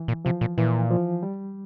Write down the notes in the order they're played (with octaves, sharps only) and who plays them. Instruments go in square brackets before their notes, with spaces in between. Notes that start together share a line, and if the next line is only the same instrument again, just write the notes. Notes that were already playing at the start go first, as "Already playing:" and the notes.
Already playing: [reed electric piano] E3
[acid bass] A#2
[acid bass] C3 [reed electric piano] F3
[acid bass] A#2
[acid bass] A#2 [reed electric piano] E3
[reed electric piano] F3
G3